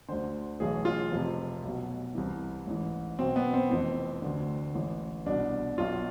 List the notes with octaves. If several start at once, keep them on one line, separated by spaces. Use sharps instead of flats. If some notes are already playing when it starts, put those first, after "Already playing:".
D2 D3 C5
B1 A2 E3 G#4
F4
F1 F2 C3
B1 B2
C2 C3 E3
A1 G#2 E3
B1 B2 C4
B3
C4
F1 F2 E3 C4
D2 D3
A1 G#2 E3
C2 B2 D4
B1 B2 F4